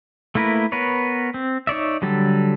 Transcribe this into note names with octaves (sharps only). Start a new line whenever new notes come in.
A3 A#3 E4 A#4 B4
B3 A#4 B4 C#5
C4
D#4 C#5 D5 E5
D3 F#3 G3 A4